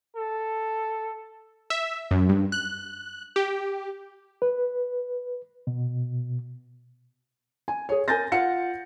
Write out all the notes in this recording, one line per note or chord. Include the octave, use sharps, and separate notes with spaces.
A4
E5
F#2
G2
F#6
G4
B4
B2
G#5
G#4 C#5
A#4 G#5 G6 A6 A#6
F4 F5 F#5 C#7